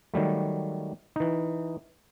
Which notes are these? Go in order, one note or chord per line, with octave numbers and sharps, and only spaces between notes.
D#3 F#3 G3 A3
E3 D#4